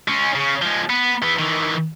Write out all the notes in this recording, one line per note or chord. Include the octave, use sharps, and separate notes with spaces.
G#3 C#4
C#3
F3 G#3
B3
E3 B3
D#3 E3